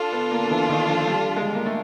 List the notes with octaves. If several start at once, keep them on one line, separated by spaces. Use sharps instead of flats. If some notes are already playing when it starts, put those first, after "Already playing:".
Already playing: D4 F4 A4
B3
A#3
E3
D#3
F3
G3
G#3
A#3
A3